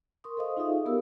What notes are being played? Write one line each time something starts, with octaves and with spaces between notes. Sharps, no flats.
A#4 C6 C#6 D#6
A4 C5 D#5 F5 D#6
D#4 F4 G#4 A4 E5 F5
B3 D#4 G4 A#4 C#5 E6